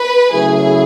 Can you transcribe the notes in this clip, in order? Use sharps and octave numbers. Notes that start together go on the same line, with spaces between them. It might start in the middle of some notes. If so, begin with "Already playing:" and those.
Already playing: B4
C#3 F#3 A3 E4 G#4